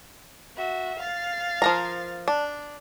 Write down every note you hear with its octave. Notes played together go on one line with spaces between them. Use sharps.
F#4 E5
F5 A6
F3 A#4 A#5
D4